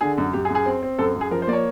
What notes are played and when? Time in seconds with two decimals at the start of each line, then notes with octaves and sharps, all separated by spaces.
0.01 D3 G#4
0.18 F#2
0.33 F#2 G4
0.45 G#4
0.50 F#2
0.55 G#4
0.66 C4
0.83 C4
0.99 F#2 A4
1.16 F#2
1.21 G#4
1.31 F3 A#4
1.42 C5
1.47 A#3 D5
1.53 C#5